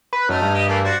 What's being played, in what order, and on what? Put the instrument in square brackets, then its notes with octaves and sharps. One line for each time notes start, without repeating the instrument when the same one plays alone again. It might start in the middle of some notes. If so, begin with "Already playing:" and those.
[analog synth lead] B4
[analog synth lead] F#2 [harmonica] A3 D#4 F6
[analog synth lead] G2
[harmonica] G4 D#5
E3 A3 A#3
F#4 C5 D5